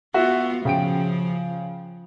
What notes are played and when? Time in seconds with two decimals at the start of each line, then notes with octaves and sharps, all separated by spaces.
0.14 B3 F4 F#4 E5
0.65 C#3 F3 G5 D7